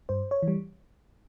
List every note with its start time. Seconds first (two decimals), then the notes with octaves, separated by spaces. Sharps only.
0.09 G2 C5
0.31 C#5
0.43 E3
0.48 G3